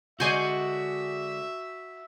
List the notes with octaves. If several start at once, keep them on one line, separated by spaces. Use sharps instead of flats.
D3 G#3 F#4 D5 E5 G#5 C6 G6